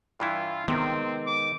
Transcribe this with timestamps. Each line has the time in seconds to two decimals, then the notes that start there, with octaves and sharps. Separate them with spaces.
0.20 G2 E3 E4 F4
0.68 C3 D#3 G#3 B3 C4
1.27 D6